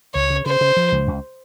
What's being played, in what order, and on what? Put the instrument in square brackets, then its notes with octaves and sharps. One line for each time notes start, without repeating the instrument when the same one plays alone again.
[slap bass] C#2 [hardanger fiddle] C#5
[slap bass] C#3
[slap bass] C#3 [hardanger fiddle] C5
[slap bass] C#3
F3
C#2
C#2